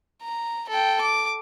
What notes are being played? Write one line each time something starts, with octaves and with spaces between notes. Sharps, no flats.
A#5
A4 G5
D6